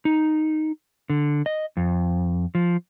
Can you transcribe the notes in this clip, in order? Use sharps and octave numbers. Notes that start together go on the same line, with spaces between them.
D#4
D3
D#5
F2
F3